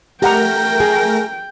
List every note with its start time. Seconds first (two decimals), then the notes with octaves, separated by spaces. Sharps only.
0.22 A3 G4 A#4 F#5 G5 A#5 A#6
0.80 G#4